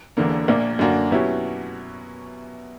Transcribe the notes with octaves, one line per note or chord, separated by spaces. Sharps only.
E1 E2 D3 A#3
A#1 A#2 A#3 D4
F#2 D3 A#3 D4 F#4
B2 F#3 C#4 E4 G4